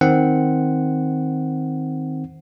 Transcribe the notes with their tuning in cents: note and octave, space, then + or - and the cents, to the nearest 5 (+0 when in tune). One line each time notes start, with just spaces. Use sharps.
D#3 +5 C4 +0 F#5 +0